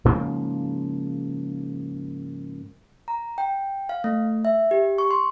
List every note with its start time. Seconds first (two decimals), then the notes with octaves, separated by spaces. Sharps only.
0.05 G#2 C#3 F3 A#3
3.08 A#5
3.38 G5
3.89 F5
4.04 A3
4.45 E5
4.71 G4
4.98 C#6
5.11 C6